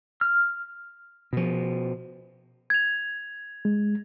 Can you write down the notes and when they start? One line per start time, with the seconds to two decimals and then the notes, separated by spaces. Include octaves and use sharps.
0.21 F6
1.33 B2 F3
2.70 G#6 F7
3.65 G#3